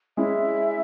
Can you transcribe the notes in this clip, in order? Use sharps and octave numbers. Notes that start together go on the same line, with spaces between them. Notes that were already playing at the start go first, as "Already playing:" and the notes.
G#3 C#4 E4 E5